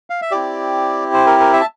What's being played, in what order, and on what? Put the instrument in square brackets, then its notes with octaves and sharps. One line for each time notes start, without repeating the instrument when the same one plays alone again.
[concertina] F5
E5
C4 E4 G4 D5
C5
A#4
A#4
E5
A5